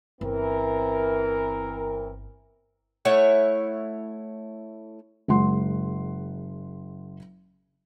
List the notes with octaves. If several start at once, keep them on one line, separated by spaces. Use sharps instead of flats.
G1 E3 C4 A#4
A3 E4 C#5 F#5
F#1 G#3 F#5 C6